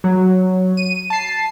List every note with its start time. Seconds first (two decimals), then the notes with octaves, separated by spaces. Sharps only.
0.04 F#3
0.77 D#7
1.10 A5 C7